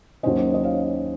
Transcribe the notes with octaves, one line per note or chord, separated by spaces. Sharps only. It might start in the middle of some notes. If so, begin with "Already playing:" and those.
D#2 D#3 F#3 A#3 C#4 C5 D#5
D#5
C#5 F5